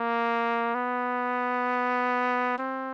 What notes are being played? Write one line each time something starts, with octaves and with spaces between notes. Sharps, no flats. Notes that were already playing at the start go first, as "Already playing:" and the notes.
Already playing: A#3
B3
C4